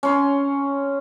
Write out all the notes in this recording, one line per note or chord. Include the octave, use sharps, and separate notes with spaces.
C#4 C6